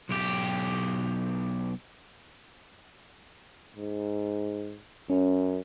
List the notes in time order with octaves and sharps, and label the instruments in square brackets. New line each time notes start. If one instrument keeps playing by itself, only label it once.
[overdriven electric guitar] B1 G4
[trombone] G#2
[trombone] F#2 [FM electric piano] C#4